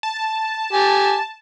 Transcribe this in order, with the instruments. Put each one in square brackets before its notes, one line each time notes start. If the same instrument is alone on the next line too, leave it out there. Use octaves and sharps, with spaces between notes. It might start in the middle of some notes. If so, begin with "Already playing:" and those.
[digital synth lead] A5
[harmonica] G4 G#5